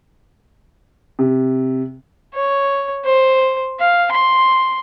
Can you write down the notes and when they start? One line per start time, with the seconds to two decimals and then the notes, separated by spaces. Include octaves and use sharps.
1.19 C3
2.34 C#5
3.05 C5
3.80 F5
4.11 C6